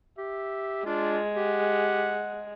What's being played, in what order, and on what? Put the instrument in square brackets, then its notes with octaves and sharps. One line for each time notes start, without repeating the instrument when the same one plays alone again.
[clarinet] G4 [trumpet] E5
[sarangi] G#3 [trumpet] D4 [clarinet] F4
[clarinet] G4 [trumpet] F#5